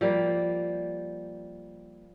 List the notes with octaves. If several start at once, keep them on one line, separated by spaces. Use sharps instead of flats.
F3 G3 A#3